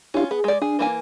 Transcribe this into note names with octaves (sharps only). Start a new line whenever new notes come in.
C#4 D4 E4 F4 G4
B3 G#4
G#3 D5
D4 G#4
E3 A#3 G#5